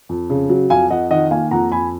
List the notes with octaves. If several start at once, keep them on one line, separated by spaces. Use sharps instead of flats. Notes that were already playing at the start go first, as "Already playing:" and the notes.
F2
C#3
F#3
F2 F5 G#5
F2 D#5 F#5
D#3 D#5 F#5
A#3 F5 G#5
F2 F#5 A#5
F2 G#5 B5